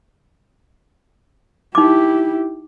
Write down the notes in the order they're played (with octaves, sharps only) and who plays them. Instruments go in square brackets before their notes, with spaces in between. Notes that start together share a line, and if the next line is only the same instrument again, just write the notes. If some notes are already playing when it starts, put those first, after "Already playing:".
[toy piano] D#4 D6 [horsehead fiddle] E4 G4